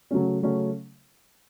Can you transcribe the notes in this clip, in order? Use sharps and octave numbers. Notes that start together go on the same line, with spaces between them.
C#3 F#3 A3 C#4
C#3 F#3 A3 C#4